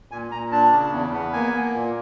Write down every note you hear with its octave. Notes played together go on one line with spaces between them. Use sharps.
A#2 G#5
A#2 A#5
D4 A5
C#3
E2
B3
A#3 G#5
A#3
A#2